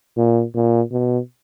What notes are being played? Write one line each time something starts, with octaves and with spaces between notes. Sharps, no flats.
A#2
A#2
B2